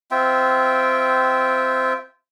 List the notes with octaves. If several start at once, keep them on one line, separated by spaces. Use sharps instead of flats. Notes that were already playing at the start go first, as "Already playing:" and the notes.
C4 F4 E5 G5